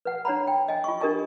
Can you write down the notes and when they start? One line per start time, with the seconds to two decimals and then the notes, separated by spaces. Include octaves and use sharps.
0.05 B4 F#5
0.25 D4 C#5 F#5 A#5 B5
0.47 G5
0.68 D#5 G#5
0.84 F4 C#6
1.00 D4 G4 A#4 D#5 G#5 C#6